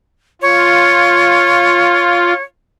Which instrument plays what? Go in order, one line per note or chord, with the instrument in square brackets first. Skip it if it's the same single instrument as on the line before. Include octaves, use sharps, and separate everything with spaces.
[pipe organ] F4 [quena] C#5